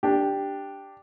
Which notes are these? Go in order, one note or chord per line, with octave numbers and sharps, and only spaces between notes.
D4 G4